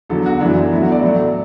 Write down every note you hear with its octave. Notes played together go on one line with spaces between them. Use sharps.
E2 D3 F#3 A4
F#4
F#2 E3 A3 D4
B2 F#3 A3 E4
F#4
D5
A2 F#3 A3